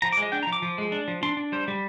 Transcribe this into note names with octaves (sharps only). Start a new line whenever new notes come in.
F3 A#5
D6
G#3
D#5
D4 G5
A#5
F3
D6
F3
G#3
D4
F3
D4 C6
D4
G3 C5
G3